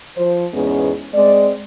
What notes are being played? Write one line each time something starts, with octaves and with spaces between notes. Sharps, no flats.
F3 C5
E2 G#2 G#3 B3 C#4
G#3 C4 D5